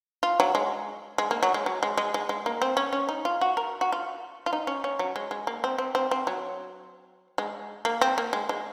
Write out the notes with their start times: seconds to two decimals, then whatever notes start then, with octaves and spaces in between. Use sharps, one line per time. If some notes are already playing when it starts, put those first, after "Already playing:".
0.23 F4
0.40 F#3
0.55 G#3
1.18 G#3
1.31 A#3
1.43 F#3
1.54 G#3
1.66 F#3
1.83 G#3
1.97 G#3
2.14 G#3
2.29 G#3
2.46 A#3
2.62 C4
2.77 C#4
2.93 C#4
3.09 D#4
3.25 F4
3.41 F#4
3.57 A#4
3.81 F#4
3.92 F4
4.46 F4
4.53 D#4
4.67 C#4
4.84 C#4
4.99 F#3
5.16 G#3
5.31 G#3
5.47 A#3
5.64 C4
5.78 C4
5.95 C4
6.11 C4
6.27 F#3
7.38 G#3
7.85 A#3
8.01 C4
8.18 A#3
8.33 G#3
8.49 G#3